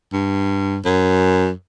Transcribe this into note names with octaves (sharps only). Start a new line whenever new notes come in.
G2
F#2